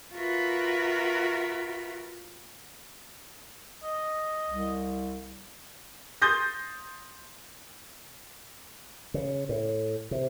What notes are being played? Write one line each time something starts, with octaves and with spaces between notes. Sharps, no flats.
F4 F#4 A#4 B4 E5
D#5
C2
C6 D#6 G6 A6 A#6
C#3
A2
C3